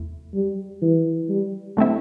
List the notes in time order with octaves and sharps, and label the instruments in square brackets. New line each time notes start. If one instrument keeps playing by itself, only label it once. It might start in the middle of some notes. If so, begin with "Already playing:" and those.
Already playing: [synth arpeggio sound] E2 C3 A3 E4
[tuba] G3
E3
G3
[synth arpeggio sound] D3 A3 C4 E4